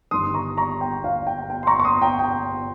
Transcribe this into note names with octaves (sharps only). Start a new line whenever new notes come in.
G1 G2 D#3 C6 D#6
A#5 C#6
A#5 C#6
G5
F5
G5
G5
C6
A#5 C#6
C#6
C6 D#6
G5 A#5
G5